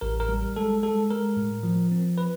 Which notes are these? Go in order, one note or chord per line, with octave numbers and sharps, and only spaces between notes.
A1 A#4
A#4
G3
G#3 A4
G#3 A4
G#3 A#4
A2
F3
C4
B4